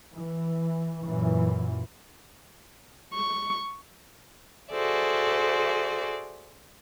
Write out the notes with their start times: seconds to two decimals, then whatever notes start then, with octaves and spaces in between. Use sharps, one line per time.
0.14 E3
1.03 F#2 A#2 E3
3.14 C#6
4.71 F#4 G#4 A4 C5 D5 E5